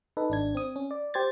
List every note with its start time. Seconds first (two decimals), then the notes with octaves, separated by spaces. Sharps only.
0.17 D#4 A4 B4
0.30 G#1 D4 G#6
0.55 C4 D#6
0.76 C#4
0.91 D5
1.14 G4 C5 G#6 A6